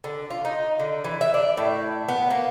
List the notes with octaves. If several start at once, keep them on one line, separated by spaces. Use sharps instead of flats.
D3
F4
D#4
D3
E3
E5
D4
A2
B3
A#3